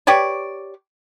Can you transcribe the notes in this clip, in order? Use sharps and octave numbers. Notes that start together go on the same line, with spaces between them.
G4 B4 C#5 D5